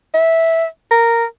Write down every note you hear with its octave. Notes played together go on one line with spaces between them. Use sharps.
E5
A#4